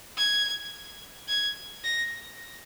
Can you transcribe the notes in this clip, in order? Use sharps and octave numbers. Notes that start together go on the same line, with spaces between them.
G#6
G#6
A#6